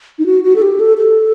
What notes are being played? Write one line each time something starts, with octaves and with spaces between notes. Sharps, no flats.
D#4
F#4
F#4
A4
G4
A4
A4